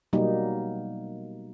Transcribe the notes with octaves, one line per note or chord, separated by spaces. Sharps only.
B2 F#3 G3 A#3 D#4